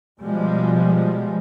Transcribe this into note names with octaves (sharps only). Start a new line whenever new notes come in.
B2 F3 G3 G#3